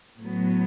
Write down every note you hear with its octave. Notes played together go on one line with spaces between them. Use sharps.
A2 F#3 B3